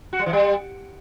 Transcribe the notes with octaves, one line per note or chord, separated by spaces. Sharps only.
F#4
G3
E3
G3